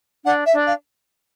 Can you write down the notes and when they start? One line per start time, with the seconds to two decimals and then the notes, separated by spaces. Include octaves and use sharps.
0.25 D4 F#5
0.46 E5
0.53 D4
0.67 F5